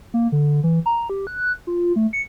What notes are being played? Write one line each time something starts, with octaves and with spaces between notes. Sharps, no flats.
A#3
D3
E3
A#5
G4
F#6
F4
A3
C#7